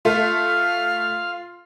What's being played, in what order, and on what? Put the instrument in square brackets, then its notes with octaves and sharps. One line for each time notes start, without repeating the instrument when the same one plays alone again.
[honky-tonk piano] A3 [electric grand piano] F4 [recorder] F5